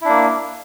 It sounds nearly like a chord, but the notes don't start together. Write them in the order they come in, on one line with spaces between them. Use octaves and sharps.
E4 D4 A#3